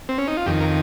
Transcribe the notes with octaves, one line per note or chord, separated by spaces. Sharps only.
C4
C#4
D#4
F4
F2 D#3 G4
A#4